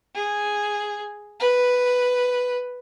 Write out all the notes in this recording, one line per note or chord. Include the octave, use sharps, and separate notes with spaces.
G#4
B4